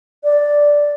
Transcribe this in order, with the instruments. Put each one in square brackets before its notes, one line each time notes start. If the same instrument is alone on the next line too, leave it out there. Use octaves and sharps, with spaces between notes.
[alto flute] D5